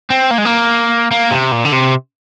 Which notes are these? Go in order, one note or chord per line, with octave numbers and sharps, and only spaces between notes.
C4
A#3
G#3
A#3
A#3
C3
A#2
D3
C3